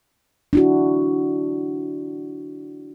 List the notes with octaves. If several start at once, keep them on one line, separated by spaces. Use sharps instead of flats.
D4 E4 F#4